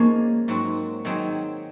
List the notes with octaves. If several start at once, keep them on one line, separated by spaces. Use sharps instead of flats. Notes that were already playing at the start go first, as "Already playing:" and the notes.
Already playing: F3 G#3 A#3 C#4 D#4 G#4
G#2 F#3 C4 F#4
D#3 F#3 C4 D#4 G#4